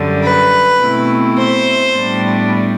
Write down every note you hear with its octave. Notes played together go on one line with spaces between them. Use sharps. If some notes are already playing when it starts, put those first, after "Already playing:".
Already playing: F#2 D3 G3
B4
B2 A3 C4 E4
C5
A2 G3 B3 D4